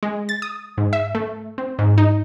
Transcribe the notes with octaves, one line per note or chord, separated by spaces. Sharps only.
G#3
A6
D#6
G#2
E5
A3
C4
G#2
D#4